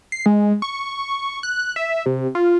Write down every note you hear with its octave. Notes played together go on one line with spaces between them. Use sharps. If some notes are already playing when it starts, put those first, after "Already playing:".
C7
G#3
C#6
F#6
E5
C3
F4